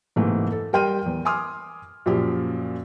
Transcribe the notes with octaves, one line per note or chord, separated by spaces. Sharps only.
G#2 C3 E3 A3 A#3
A4
G3 A#4 G5 C6 F6 D#7
E2
G#5 C6 D6 D#6 F6
F#2 A#2 F3 F#3 G4